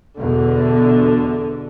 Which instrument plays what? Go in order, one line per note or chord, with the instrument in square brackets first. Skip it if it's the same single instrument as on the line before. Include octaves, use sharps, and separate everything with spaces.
[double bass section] E2 B2 [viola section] D3